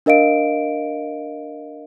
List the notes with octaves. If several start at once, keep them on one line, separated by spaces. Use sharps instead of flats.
D4 A#4 D#5 F5 D7